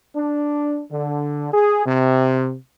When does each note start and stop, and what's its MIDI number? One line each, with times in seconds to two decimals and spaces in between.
0.15 0.81 62
0.91 1.47 50
1.52 1.83 68
1.86 2.55 48